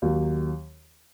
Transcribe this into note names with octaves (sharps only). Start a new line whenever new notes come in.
D#2 D#3 F#3